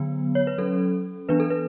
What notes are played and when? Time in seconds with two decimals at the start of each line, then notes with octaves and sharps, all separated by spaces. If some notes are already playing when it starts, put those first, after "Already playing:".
Already playing: D3 F#3 B3
0.35 C#5
0.47 B4
0.58 F#3 C#4 A4
1.29 E3 B3 D4 B4
1.40 A4
1.50 B4